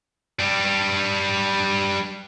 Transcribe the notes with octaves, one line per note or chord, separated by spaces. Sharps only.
G3 D4